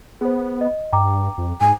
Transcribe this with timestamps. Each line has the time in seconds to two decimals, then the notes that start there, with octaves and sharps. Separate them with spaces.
0.21 B3 G#4 C5
0.61 D#5
0.92 G2 G5 A#5 D6
1.38 F2
1.61 G#2 G#5